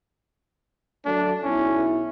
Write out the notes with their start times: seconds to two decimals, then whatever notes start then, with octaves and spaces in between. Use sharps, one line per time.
1.05 F#3 A3 D4
1.43 B1 C#4 E4